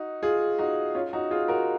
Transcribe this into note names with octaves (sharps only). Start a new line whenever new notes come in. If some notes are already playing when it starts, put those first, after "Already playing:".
Already playing: D#4 F#4
F4 G#4
D#4 F#4
C#4 F4
D#4 F#4
F4 G#4
F#4 A#4